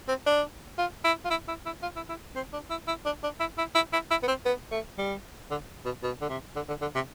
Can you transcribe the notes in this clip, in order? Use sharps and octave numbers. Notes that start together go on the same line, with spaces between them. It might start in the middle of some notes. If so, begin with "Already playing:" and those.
C4
D4
F4
E4
F4
E4
E4
E4
F4
E4
E4
C4
D4
E4
E4
D4
D4
E4
E4
E4
E4
E4
B3
C4
B3
A3
G3
D3
B2
B2
D3
C3
D3
D3
D3
C3